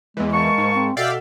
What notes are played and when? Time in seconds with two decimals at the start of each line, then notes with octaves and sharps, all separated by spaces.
0.17 E2 E3 G#3
0.33 A#3 A5 C#6
0.58 G#2
0.76 C4
0.97 B2 F#4 A4 D5 E5 F5 G5